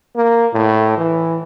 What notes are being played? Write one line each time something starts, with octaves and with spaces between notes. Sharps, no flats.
A#3
A2
E3